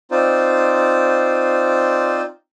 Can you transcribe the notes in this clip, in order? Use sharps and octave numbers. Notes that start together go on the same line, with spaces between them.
C4 D#4 F4 C5 D5